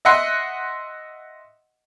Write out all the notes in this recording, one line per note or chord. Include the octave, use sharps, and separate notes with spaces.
D#5 E5 F#5 C6